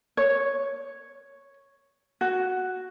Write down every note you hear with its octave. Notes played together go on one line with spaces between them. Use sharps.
C#5
F#4